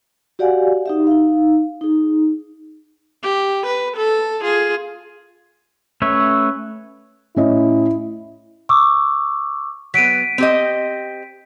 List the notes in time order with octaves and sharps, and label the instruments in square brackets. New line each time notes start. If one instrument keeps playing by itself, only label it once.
[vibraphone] F#4 G4 D5 F5 F#5 G#5
D#4 G4 E5
D#4 F5
D#4 G#4
[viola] G4
B4
A4
F4 G#4
[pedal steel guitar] A3 C#4 B4 C#5 E5
[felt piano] A2 C#4 D#5 [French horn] E4
[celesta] C#6 D6 E6
[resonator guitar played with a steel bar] F#3 B3 [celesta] B6 D7 D#7
[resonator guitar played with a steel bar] C4 G4 D#5